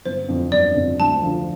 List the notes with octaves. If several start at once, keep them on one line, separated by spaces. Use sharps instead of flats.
G1 C5
F2 D3
G1 D5
F2 D3
D2 A5
D3 F3